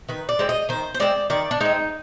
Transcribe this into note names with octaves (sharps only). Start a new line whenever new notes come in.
D#3 B4
D5
G#3 C4
D#5
D#3 C5
C5
G#3 C4 D5
D#3 D5
D4
G#3 C4 D#4